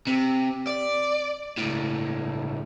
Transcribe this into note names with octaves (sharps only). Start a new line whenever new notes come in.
C3
D5
C#2 A2